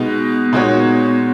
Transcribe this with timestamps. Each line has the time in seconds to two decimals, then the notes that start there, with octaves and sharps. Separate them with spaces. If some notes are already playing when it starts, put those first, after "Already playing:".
Already playing: B2 G#3 B3 D#4
0.53 A#2 G#3 B3 D#4 F#4 C#5